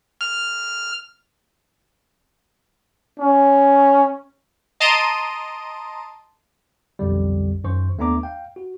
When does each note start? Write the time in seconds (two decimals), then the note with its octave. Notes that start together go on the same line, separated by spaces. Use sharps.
0.21 F6
3.19 C#4
4.80 D#5 A5 A#5 C6 D7 D#7
6.99 B1 F2 D3 G3
7.64 F#2 D#3 C5 C#6
7.98 D#2 A3 B3 D4 A#5 D6
8.23 F5 G5
8.56 F#4